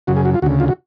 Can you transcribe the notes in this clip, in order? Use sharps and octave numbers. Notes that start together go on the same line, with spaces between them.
F#2 C#3 F#4
G#4
F#4
F4
D2 C#3 F#4
F4
F#4